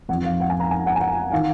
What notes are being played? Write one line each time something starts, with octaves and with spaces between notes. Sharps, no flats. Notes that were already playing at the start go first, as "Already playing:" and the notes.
F2 F3 F#5
F5
F#5
G#5
A#5
G#5
F#5
G#5
F#5
D#3 F5